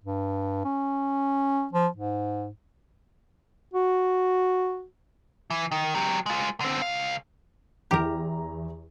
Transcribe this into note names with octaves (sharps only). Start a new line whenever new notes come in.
G2
C#4
F3
G#2
F#4
E3
D#3
F#3 G4
G#3 F4
D3 C4
C#2 F5
E2 E4 G4 A#4 A#5